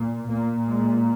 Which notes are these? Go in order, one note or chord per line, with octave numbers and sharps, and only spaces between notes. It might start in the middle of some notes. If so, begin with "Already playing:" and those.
Already playing: A#2
A#2 A#3
G#3